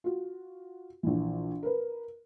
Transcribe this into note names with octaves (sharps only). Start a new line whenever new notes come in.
F4 F#4
A#1 E3
A#4 B4